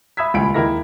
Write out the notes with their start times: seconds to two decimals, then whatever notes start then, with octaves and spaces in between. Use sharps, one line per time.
0.17 E5 B5 D#6 E6 G#6 B6
0.34 D#1 C#2 F4 G#5 B5 D7
0.54 D#2 G#3 D#4 E4 A#4 A#6